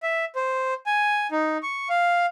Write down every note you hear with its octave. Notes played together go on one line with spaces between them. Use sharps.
E5
C5
G#5
D#4
C#6
F5